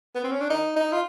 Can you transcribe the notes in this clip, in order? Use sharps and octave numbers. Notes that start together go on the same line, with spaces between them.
B3
C4
C#4
D4
D#4
D#4
F4